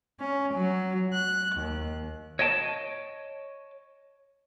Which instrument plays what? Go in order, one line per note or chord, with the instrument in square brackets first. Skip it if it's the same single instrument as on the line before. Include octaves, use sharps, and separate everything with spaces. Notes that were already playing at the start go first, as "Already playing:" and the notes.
[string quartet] C#4
F#3
F#6
D#2
[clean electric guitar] C#5 D#5 G5 A5